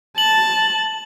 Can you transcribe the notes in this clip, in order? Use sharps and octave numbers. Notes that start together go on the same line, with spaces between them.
A5 F#7